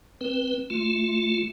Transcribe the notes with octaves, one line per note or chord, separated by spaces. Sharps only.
C4 B4
A3 F4